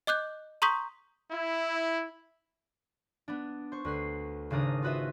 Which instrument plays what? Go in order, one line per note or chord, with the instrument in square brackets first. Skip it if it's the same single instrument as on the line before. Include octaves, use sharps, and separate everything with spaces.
[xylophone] D#5 D6 F#6 G6
A#5 C6 C#6 D#6 G6 B6
[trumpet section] E4
[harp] B3 D4
C5 C#6
D2 B4 C7
G#1 C#3 D4 A#4 D#6
F4 F#4 B4 D#5 E5